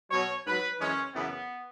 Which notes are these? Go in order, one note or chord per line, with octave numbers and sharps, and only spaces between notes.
B2 F#3 C#5
G#2 F#3 B4
F#2 E3 G#3 C#4
F#2 C#3 E3 B3